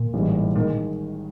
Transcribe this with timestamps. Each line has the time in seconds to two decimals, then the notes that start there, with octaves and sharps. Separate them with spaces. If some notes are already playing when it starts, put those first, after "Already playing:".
Already playing: A#2
0.13 A1 G#2 E3 G3
0.56 A#2 D#3 G#3